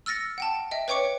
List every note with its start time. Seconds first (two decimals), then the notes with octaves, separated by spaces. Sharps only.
0.06 E6 F6 A6 A#6 C#7
0.38 F#5 G5 A5
0.71 D#5 E5 G5
0.88 B4 C#5 G5 C#6 D6 C#7